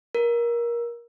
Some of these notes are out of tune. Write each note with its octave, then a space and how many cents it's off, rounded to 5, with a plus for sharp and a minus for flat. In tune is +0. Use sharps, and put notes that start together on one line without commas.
A#4 +20